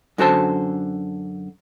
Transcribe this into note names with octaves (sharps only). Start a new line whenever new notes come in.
F#2 D3 F#4 A4 C5 A5